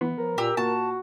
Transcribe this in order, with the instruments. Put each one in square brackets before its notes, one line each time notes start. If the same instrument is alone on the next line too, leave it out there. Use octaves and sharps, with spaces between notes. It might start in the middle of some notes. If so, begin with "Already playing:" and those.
[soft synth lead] E3 [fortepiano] B3
[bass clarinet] F3 [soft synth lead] A#4
[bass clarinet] A#2 [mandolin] G4 E6
[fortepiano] A#2 [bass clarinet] F#4 [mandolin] A5